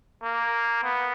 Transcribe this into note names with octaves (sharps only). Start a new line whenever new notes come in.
A#3
B3